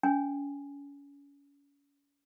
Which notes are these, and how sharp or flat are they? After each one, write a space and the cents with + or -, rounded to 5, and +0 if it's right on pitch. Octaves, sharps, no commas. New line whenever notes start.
C#4 +35 G#5 +0